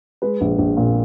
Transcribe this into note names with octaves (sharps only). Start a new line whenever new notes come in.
G#3 B4
A#1
A#1
A#2